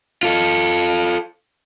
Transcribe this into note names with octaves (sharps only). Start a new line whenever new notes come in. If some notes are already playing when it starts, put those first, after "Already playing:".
F4 A4